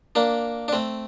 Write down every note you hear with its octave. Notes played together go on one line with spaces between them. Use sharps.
A#3 D4
D4
A3 C4